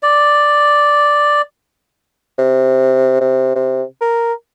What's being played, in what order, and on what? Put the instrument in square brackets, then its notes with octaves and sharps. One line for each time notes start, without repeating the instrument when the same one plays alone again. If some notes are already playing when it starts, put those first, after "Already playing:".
[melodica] D5
[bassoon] C3
C3
C3
A#4